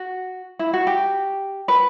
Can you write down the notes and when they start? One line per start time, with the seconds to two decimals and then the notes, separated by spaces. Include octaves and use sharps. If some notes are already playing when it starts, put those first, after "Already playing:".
Already playing: F#4
0.59 E4
0.73 F#4
0.87 G4
1.68 B4